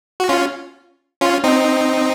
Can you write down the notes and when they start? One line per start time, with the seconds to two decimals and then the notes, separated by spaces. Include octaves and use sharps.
0.20 F#4
0.29 C#4 F4
1.21 C#4 F4
1.44 C4 D#4